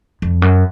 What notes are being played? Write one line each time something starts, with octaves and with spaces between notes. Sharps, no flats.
F2
F#2